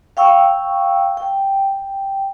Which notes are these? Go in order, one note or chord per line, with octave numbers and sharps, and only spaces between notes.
F5 G5 C#6 E6
G5